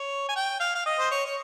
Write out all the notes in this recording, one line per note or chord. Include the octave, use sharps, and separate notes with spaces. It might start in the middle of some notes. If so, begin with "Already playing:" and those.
Already playing: C#5
G#5
G5
F5
F5
D#5
C5
C#5
C#5